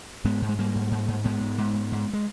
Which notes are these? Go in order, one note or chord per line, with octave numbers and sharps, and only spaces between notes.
G#2 G#3 B3
G#2
G#3
G#2 G3 A#3
G#2
G#2
G#2
G#2 G#3 B3
G#2
G#2
G#2
G#2
G#3